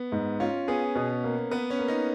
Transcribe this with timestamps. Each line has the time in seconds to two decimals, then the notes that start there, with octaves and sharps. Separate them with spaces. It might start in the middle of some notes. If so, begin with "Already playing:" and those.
Already playing: B3
0.12 G#2
0.40 C#4 F4
0.68 B3 G#4
0.96 B2
1.24 A#3
1.51 B3 B4
1.70 C#4
1.79 A#3
1.88 D#4